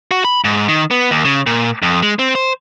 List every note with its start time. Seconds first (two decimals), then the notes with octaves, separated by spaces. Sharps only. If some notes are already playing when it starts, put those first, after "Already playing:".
0.11 F#4
0.25 B5
0.44 G#2
0.68 D#3
0.91 B3
1.11 D#2
1.25 C#3
1.47 A#2
1.82 F2
2.03 G#3
2.19 C4
2.35 C5